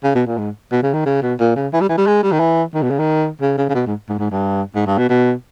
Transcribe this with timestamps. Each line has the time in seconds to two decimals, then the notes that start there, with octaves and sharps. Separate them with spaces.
0.04 C#3
0.15 B2
0.27 A#2
0.38 G#2
0.72 B2
0.83 C#3
0.94 D#3
1.06 C#3
1.22 B2
1.40 A#2
1.56 C#3
1.73 E3
1.81 G3
1.89 E3
1.98 G3
2.07 G#3
2.23 G3
2.32 D#3
2.40 E3
2.74 D#3
2.83 B2
2.90 C#3
2.99 D#3
3.42 C#3
3.58 C#3
3.69 C#3
3.75 B2
3.86 G#2
4.09 G#2
4.19 G#2
4.31 G2
4.75 G#2
4.87 G2
4.98 B2
5.10 B2